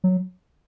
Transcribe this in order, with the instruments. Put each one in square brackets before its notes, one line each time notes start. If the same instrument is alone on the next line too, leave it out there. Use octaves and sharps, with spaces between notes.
[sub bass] F#3